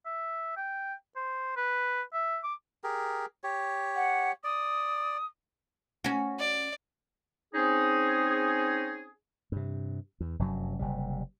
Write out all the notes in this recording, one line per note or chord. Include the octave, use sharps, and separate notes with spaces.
E5
G5
C5
B4
E5
D6
G4 G#4 A#4
G4 C#5
F#5
D5 D#6
C#4 F#4
D5
C4 C#4 D#4 G#4
G2 C3
E2
F1 F#2 F#3
F#1 C3 G3